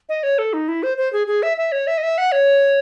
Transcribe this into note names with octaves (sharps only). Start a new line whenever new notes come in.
D#5
C#5
A4
D#4
E4
C5
C5
G#4
G#4
E5
E5
C#5
E5
D#5
E5
F#5
C#5